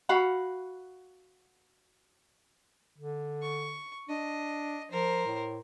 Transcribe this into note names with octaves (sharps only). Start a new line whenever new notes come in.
F#4 F5 F#5 B5
D3
C#6
D4 D#5
F3 A#4 C5
A2